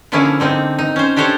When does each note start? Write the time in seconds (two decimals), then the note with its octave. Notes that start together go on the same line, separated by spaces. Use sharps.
0.12 D3 F3 A#3 C#4 E4 G#4
0.40 D3 C4 D#4
0.79 D#4
0.96 C#4 C5
1.16 D4 G4 A4 C5 C#5